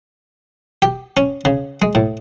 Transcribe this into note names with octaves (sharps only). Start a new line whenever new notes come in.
G4
C#4
C#3
G#3
A2